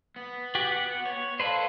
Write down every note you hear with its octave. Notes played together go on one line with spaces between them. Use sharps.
B3
F#4 G4
F#5
C#5
A4 B4 C5 D5 F5